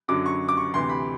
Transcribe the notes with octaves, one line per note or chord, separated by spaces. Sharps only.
F#2 D3 F#3 D6
C#6
D6
C#6
D2 C3 E3 C6
B5